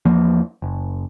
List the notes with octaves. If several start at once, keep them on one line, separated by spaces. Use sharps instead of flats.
E2 F3 A#3
F#1